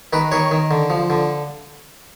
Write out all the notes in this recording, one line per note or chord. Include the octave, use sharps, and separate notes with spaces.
D#3 B4
D#3 C#5
D#3
D3
F3
D3